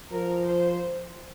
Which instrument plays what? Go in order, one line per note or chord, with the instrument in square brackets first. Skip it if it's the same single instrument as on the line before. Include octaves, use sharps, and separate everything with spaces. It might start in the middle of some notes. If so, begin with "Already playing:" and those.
[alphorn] F3 [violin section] A#4
[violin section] C5